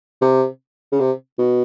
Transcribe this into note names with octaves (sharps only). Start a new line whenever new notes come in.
C3
C#3
C3
B2